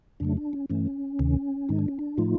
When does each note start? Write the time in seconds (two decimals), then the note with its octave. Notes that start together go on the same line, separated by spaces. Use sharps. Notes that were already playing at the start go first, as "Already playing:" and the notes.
0.20 F2 C#3 F#3 A3 D4
0.37 D4
0.53 C#4
0.70 G2 E3 A3 C#4
1.19 D2 C3 D#3
1.69 G#2 D#3 G#3 D#4
1.79 D4
1.88 C#4
1.99 D4
2.17 A2 F3 A3 D#4 F4